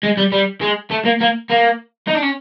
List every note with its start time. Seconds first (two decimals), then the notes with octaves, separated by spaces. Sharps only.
0.03 G#3
0.17 G3
0.32 G3
0.61 G#3
0.91 A3
1.05 A#3
1.21 A#3
1.50 A#3
2.07 D#4
2.15 D4
2.22 C#4